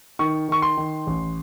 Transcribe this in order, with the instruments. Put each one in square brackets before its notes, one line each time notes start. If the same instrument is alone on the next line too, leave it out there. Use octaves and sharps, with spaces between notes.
[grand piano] D#3 C#6
D#3 C#6
C6
D#3
A1